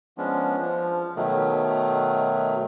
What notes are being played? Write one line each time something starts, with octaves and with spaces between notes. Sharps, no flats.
F3 G#3 B3 C#4 D4
F3
B2 D#3 F#3 A3